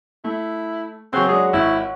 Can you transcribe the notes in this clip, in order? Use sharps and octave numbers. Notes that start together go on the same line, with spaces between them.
A3 E4
C#3 F#3 C4 C#5 F#5
F#3 G#3 D4 G#4
G#1 E4